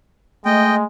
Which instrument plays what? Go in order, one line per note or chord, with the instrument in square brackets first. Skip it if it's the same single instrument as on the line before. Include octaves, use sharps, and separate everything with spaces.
[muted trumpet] G#3 [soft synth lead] A3 [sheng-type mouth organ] D#5 G5